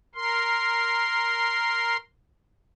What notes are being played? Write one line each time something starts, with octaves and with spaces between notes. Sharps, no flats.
A#4 C6